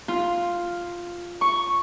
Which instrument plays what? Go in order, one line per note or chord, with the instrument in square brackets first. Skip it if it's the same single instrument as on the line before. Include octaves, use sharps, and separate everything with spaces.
[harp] F4
C#6